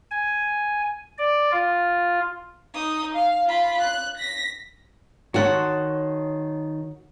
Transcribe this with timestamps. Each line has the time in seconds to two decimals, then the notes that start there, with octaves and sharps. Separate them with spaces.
0.11 G#5
1.18 D5
1.52 F4
2.74 D#4 D#6
3.14 F5
3.46 F4 B5
3.81 F#6
4.17 A#6 B6
5.34 D#3 F#4 C#5 F#5 A5 C6